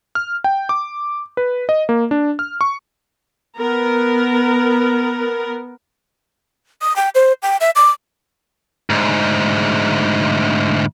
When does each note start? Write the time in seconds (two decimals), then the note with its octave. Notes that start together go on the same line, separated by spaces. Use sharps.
0.15 F6
0.44 G5
0.69 D6
1.37 B4
1.69 D#5
1.89 A#3
2.11 D4
2.39 F6
2.61 C#6
3.59 B3 A#4
6.81 D#6
6.96 G5
7.15 C5
7.42 G5
7.61 E5
7.76 D6
8.90 D2 G#2